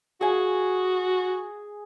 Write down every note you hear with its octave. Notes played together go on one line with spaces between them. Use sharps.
F#4 G#4 G#5